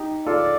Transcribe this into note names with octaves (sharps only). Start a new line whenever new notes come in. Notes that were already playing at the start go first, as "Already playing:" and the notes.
Already playing: D#4 G4
F4 A4 D5